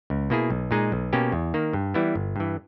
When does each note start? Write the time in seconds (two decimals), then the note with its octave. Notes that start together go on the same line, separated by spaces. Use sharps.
0.10 C#2
0.30 B2 A#3 E4 G#4
0.50 B1
0.71 A#2 G#3 D#4 G#4
0.92 B1
1.13 B2 A#3 C#4 G4
1.32 E2
1.54 D#3 A#3
1.73 G2
1.94 E3 G3 B3 E4
2.15 G1
2.36 G2 E3